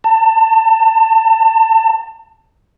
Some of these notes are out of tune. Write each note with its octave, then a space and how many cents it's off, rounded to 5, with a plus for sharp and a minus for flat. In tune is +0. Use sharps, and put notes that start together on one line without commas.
A5 +30